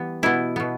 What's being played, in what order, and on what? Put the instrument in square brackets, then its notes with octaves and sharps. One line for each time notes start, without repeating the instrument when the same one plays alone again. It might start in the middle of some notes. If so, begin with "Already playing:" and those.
Already playing: [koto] E3 G3 B3
B2 B3 E4
B2 B3